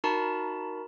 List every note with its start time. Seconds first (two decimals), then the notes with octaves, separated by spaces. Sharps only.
0.04 D#4 F#4 A#4 A5 B5